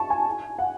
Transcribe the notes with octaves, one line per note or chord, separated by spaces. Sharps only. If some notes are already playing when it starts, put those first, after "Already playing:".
Already playing: A5 C#6
G#5
F#5